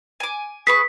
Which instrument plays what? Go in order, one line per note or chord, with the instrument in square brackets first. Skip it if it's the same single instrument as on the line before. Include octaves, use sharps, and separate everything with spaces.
[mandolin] G#5 D6
[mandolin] G#4 B4 C#6 [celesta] B6